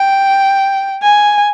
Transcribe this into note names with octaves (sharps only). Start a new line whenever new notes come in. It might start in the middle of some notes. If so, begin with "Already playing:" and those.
Already playing: G5
G#5